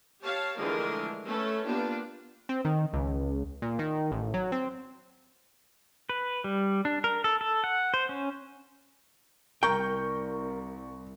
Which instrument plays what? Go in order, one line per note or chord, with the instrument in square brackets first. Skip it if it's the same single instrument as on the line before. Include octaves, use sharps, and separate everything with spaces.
[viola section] G4 C#5 F5 A5
D3 E3 F3 G#3 A3 A#4
A3 C#4 A4 B4
A#3 B3 D4 F4 G4
[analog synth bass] C4
D#3
C#2
A#2
D#3
A1
F#3
C4
[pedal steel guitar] B4
G3
D4
A#4
A4
A4
F#5
C5
C#4
[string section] C2 [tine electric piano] A#4 [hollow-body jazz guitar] G5 [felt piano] A#5 C#6 G6